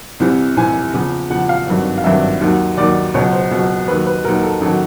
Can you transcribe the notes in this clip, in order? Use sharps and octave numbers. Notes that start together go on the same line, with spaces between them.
C2 C3 E3
C2 C3 E3 G#5
E2 C#3 F3
E2 C#3 F3 F#5
F5
G#1 G2 D#3 F#3
F5
G#1 G2 D#3 F#3 E5
D#2 D#3 F#3
D#2 D#3 F#3 D5
C#2 B2 F#3 C#5
C5
C#2 B2 F#3
D#2 D#3 F#3 B4
B4
D#2 D#3 F#3 A#4
A4
A1 D#3 F#3 A4